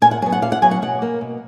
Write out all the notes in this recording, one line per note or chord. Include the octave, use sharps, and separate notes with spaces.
A#2 G#5
F#5
F#3 B3 G#5
F#5
A#2 F5
F#5
F#3 B3 G#5
F#5
B2 F#5
A#3
B2